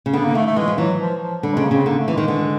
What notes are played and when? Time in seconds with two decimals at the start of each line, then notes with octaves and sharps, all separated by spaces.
0.06 C#3
0.13 D3 B3
0.25 A#3
0.35 D#3 A3
0.47 A3
0.56 E3 G#3
0.68 F3
0.78 E3 F#3
1.00 F3
1.22 F3
1.43 D3 G3
1.54 G#3
1.57 C#3
1.64 A#3
1.71 C#3 C4
1.86 D3 A#3
2.00 A3
2.08 E3
2.14 D#3 G#3
2.28 D3